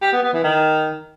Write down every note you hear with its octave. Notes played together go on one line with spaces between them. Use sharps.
G4
B3
B3
E3
D#3